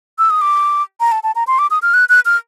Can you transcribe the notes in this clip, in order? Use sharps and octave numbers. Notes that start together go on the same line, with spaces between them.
E6
D#6
D6
A#5
A5
A5
A#5
C6
D6
D#6
F6
F#6
F#6
F6